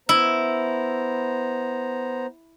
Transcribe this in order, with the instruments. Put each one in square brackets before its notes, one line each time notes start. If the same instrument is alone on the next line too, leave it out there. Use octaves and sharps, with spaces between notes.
[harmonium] B3 C5 A#5 [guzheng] E4